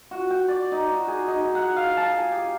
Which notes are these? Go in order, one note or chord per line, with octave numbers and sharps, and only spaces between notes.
F#4
G5
D5
D#4
F#4
G#4
D#4
F#5
F5
A5
G#4
G4